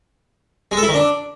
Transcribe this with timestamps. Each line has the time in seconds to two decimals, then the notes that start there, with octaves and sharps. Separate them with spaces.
0.71 G#3
0.77 A4
0.83 E4
0.88 D#3
0.94 D4